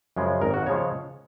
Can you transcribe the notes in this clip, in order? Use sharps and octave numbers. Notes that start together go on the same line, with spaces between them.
F#2 C#3 F3 G#3
G#1 A#4
F#4
C#3 F3 G#3 C#5